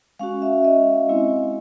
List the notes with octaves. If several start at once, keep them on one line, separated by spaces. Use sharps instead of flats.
G#3 C#4 F#4 F5
E5
D#5
G#3 C4 E4